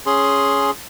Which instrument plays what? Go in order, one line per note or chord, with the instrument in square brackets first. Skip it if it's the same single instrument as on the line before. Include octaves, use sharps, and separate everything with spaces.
[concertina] C#4 G#4 C6